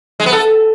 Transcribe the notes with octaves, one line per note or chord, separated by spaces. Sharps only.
G#3
B3
A4